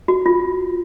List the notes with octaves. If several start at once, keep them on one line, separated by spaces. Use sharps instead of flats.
F#4
F4